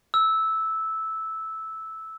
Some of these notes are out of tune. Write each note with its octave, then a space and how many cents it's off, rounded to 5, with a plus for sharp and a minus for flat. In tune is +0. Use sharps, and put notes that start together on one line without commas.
E6 -10